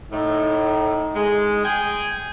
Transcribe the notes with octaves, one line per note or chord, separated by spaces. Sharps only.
A2 D#4
G#3
G#4 G5 G#5